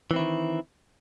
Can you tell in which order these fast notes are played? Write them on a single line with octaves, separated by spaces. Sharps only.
E3 C4 E4 D#3